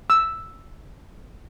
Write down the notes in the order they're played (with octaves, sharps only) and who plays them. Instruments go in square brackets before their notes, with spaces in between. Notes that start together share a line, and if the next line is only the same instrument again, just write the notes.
[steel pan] E6